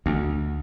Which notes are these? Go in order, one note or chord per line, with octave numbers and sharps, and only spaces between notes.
D2